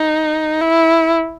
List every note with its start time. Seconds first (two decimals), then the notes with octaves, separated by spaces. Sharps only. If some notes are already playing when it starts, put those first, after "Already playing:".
Already playing: D#4
0.61 E4